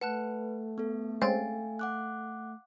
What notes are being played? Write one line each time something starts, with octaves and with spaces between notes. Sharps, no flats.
A3 B4 F#5 A5 F#6
B3 A4
G#3 C4 C#4 F5 G5 G#5 A6
F#5 D6 F#6